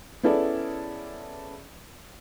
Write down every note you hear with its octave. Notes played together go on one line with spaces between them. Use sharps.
B3 C#4 E4 G#4 A4 D5